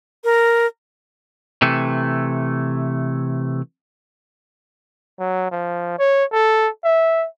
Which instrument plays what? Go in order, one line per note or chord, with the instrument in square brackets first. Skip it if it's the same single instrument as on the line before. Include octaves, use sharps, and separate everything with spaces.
[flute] A#4
[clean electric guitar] C3 E3 A3
[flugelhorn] F#3
F3
C#5
A4
E5